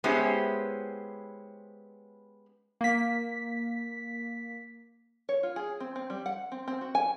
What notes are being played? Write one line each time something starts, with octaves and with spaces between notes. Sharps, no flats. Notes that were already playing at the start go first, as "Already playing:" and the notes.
G#3 B3 C#4 E4 G4 C5
A#3 B6
C#5
F4
G#4
C4
C4
G3
F#5
C4
C4
F#4
G#5